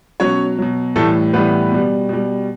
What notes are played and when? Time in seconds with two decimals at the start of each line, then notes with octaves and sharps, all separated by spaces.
0.20 B2 F#3 C#4 C#5
0.58 B2 F#3
0.96 A2 E3 G3 A3 A4
1.33 A2 E3 G3 B3 B4
1.71 B2 G3
2.09 B2 G3